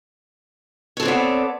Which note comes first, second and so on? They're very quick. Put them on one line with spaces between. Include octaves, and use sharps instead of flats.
C#5 A4 C4 D5 B3